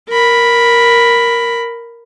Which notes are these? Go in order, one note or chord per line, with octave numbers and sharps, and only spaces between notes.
A#4 B5